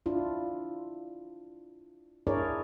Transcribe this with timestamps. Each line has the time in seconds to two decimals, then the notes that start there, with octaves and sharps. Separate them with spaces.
0.06 D4 E4 F4
2.27 D4 E4 G#4 A#4 C#5 D5